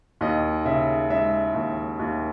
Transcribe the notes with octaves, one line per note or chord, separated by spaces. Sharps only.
D#2 D#5
C#3 E5
G#3 E5
D#2
D#2